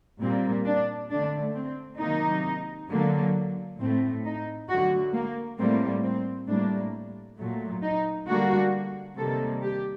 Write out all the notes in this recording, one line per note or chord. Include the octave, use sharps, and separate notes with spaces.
A#2 G3 A#3 C4
D4
D3 A3 D4
C4
C3 D#3 F#3 A#3 D#4
D3 F#3 A#3
A2 A3 C4
D#4
D3 F#3 A3 F#4
A#3
A2 G3 A#3 C4
C4
A2 G3 A#3 D4
A#2 F#3 A3
D#4
D3 G3 A#3 F#4
C3 D#3 G3 A#3 A4
G4